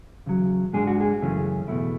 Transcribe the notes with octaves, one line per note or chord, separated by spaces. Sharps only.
E2 C#3 F#3
G#2 G#3 D4 G#4
F#4
G#4
F#2 C#3 E3 A3 C#4
E2 B2 A3 E4